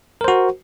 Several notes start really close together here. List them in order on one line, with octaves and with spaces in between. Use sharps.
A#4 C5 F#4